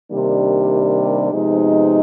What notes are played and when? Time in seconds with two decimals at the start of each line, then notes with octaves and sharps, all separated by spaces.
0.12 C3 D#3 G3 A#3 D4
1.32 C3 F3 G#3 B3 D#4